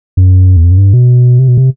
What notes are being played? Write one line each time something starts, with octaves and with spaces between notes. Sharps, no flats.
F#2
E2
F2
F#2
G2
B2
C3
B2
C3